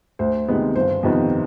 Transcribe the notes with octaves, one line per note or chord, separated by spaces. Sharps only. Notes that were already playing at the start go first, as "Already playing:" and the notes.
D2 C5
C3 D#3 G#3 B3
G1 C5
F2 C3 D#3 B3